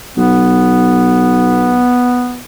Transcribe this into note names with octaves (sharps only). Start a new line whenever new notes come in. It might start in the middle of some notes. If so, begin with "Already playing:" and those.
B1 B3